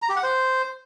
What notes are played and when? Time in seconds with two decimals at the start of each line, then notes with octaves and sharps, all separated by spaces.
0.02 A#5
0.09 G4
0.16 F#5
0.23 C5